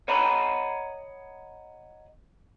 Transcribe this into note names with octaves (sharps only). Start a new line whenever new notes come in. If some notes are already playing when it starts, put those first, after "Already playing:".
C#5 D#5 F#5 A#5 B5